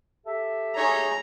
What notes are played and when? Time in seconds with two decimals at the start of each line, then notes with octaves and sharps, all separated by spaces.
0.25 G4 A4 E5
0.76 D#4 G#4 C#5 A#5